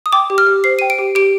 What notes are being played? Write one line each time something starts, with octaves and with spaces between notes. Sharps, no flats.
D#6
G5 D6
G4
F6
G4
C5 C7
G5 D#7
D7
G4
G4 D7